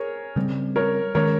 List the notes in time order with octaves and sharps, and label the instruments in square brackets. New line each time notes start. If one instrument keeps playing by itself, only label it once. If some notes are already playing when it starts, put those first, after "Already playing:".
Already playing: [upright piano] G#4 A#4 C#5
[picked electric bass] C#3 G3 C4
[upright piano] A#4 C#5
[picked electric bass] D#3 G#3 C#4 [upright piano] A#4 C#5